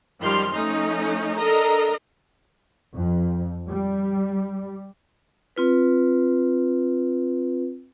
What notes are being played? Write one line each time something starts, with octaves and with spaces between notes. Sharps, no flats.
F#2 D#3 F3 G3 C6 F6
F3 A3 C#4 D#4
D4 A4 A#4 D#5 A#5
F2
G3
C4 F4 B4